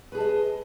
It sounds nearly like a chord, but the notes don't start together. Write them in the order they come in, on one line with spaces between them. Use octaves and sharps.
B4 G#4 A5 D#5